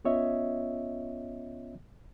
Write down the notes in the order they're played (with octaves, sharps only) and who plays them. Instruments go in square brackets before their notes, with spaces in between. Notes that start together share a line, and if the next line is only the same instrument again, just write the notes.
[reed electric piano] B3 C#4 F4 C#5 D#5 E5